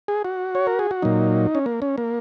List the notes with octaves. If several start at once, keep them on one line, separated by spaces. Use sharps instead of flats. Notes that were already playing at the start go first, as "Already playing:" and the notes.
G#4
F#4
C#5
A#4
G#4
F#4
A#2 F#3 D#4
C#4
A#3
C#4
A#3